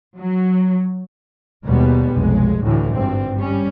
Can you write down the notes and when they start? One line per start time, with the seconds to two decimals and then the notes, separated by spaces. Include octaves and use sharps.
0.18 F#3
1.65 D#2 B2 G3 G#3 B3
2.13 F1 B1 G#3
2.62 D2 A2 D3 E3
2.92 G#1 G2 C4
3.38 G3 C#4